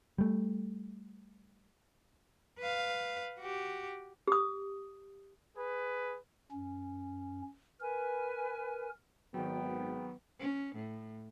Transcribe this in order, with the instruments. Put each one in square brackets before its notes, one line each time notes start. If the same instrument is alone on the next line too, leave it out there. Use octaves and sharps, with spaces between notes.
[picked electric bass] G3 A3
[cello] B4 F5
F#4 G4
[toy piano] G4 D#6
[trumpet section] G#4 B4
[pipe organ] F#2 C#4
[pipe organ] A#4 [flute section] B4 G#5
[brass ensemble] G#1 [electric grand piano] D#3 F#3 [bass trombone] B3 [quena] G5
[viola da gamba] C#4
A2